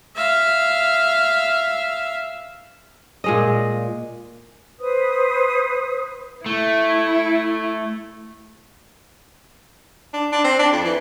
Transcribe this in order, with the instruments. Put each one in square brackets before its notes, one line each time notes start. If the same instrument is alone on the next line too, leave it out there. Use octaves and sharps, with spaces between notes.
[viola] E5 F5
[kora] A#2 G#3 D#5
[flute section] B4 C5 D#6
[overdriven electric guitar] A3 [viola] E4
[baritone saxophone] D4
D4
C4
D4
F2
E3